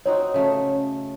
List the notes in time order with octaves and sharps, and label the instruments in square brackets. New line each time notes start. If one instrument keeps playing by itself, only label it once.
[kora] C4 D#4 F#4 [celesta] C#5
[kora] C#3 A3